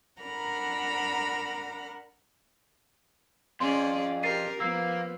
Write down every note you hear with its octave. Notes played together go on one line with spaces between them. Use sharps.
D4 A#4 F#5 A#5 B5
F2 C#4 G#4 D5 C6
G4 A#4 A6 C7 D#7
F3 A#3 B3 E6 C7